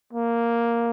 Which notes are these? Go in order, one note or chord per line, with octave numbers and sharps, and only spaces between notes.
A#3